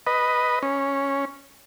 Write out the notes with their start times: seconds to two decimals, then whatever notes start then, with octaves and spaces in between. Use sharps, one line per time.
0.07 B4 D#5
0.63 C#4